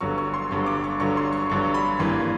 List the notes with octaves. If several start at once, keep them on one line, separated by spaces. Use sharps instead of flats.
G1 G2 D3 F#3 C#6
C#6
C6
G1 G2 D3 F#3 C#6
D6
C#6
G1 G2 D3 F#3 C#6
C6
C#6
G1 G2 D3 F#3 C#6
B5
G#1 G2 E3 G3 A#3 C6